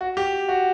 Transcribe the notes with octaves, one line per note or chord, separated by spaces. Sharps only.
F#4
G4
F#4